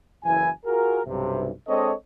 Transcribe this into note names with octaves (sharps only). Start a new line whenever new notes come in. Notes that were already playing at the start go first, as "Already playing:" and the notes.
F#1 E3 E4 G#5
F4 F#4 G#4 A#4
B1 G2 C3
G#3 C4 D4 A4 C#5 D#5